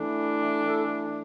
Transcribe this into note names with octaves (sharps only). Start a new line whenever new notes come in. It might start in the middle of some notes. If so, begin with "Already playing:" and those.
Already playing: E3 A3 D4
A4